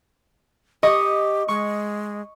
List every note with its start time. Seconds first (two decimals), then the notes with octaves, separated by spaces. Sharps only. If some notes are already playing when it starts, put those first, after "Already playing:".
0.83 G4 D#5 C#6 D#6
1.48 G#3 C#6